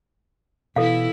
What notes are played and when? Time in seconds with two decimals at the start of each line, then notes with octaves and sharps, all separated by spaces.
0.76 B2 E3 E4 A4 F5